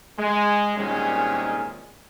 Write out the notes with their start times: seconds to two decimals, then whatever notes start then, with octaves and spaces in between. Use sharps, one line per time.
0.19 G#3
0.77 C2 A#2 D#3 G#3 C#4 G#4